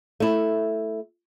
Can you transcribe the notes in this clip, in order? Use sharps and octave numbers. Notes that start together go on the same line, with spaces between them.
A3 E4